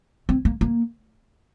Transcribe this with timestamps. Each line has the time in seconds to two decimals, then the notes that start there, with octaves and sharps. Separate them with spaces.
0.29 C4
0.45 A#3
0.61 A#3